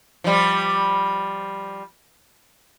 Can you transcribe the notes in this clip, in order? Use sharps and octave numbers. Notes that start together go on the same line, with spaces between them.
F3 G3